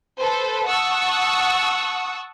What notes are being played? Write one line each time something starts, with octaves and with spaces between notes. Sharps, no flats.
A4 B4 C5
F#5 A5 C#6 D#6 E6 F#6